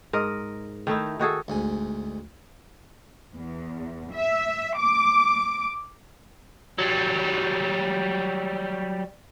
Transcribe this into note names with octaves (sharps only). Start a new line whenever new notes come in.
G#2 A#4 D#5
D#3 A3 D#4 E4
D#3 F#4 G#4 A4
D2 G#2 G#5
E2
E5
D6
F#3 G3